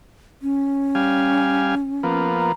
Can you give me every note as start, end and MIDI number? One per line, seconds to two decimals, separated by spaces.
0.42 2.26 61
0.95 1.75 55
0.95 1.75 77
0.95 1.75 80
2.03 2.52 53
2.03 2.52 58
2.03 2.52 59
2.40 2.53 82